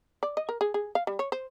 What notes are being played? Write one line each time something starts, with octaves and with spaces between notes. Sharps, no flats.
D5
D#5
A#4
G#4
G#4
F5
G3
C#5
C5